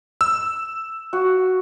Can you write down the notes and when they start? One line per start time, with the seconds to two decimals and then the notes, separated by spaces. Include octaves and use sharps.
0.21 E6
1.13 F#4